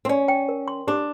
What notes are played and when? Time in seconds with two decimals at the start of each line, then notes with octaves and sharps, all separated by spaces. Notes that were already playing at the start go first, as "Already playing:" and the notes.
0.05 C4
0.09 C#4 D5
0.28 G5
0.49 A#4
0.68 C6
0.87 D4 G4